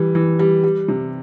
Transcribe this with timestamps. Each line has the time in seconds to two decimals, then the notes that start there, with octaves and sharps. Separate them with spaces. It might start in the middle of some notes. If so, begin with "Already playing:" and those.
Already playing: E3 G3
0.15 E3
0.39 G3
0.64 G3
0.88 C3